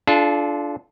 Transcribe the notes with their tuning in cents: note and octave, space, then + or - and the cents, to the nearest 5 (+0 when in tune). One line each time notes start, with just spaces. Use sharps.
D4 -5 F4 -20 A4 -40